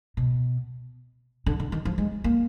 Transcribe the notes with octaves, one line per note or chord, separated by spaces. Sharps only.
B2
D3
D3
D#3
F3
G#3
A#3